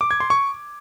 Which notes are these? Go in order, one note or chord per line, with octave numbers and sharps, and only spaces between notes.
D6
G#6
C6
C#6